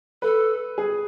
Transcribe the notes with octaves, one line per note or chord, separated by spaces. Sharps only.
A4 B4
G#4